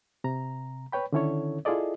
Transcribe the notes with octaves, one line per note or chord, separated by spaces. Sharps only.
C3 A#5
B4 C#5 G5 B5
D3 D#3 C#4 E4 A4 C#5
E4 F4 G#4 A4 D5 D#5